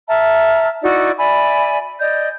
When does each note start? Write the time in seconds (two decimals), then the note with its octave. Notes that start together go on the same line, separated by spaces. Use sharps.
0.09 E5 A5 A#5 F6
0.83 D#4 E4 F#4 D5
1.18 D5 E5 G#5 B5
1.99 D5 D#5 G6